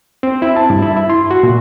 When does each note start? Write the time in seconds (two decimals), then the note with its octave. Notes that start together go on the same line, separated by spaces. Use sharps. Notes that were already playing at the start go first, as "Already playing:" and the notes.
0.23 C4
0.42 E4
0.56 A5
0.70 G2
0.83 E4
0.97 E4
1.10 C6
1.31 F#4
1.43 A#2